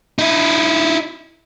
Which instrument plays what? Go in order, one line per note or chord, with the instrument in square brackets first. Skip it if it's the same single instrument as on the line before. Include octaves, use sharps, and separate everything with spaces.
[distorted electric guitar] D#4 E4